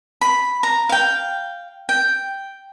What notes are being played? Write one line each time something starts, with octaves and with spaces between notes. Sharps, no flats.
B5
A#5
F5 G5
G5